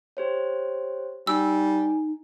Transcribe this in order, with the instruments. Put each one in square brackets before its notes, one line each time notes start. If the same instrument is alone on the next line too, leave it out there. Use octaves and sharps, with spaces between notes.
[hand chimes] G4 C5 C#5
[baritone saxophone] G3 [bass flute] D#4 [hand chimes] G#5 [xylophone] E6